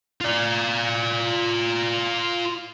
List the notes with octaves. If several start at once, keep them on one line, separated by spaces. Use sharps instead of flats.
F4 D5